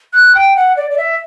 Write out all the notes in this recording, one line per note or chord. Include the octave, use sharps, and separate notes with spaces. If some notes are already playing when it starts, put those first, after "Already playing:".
F#6
G5
F#5
D5
D5
E5